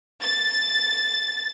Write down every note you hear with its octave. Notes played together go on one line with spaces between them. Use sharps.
A6